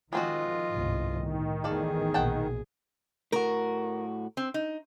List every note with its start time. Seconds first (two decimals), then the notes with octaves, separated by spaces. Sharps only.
0.13 D#3 F3 G#3 C4 F4 F#4 D#5
0.72 G1 C2 G#2
1.12 A2 D#3
1.64 A1 E2 G#4 A4 D5 F5
2.14 A#1 B2 F#5 G5 A5
3.32 A2 F#4 A#4
4.37 C4
4.54 D#4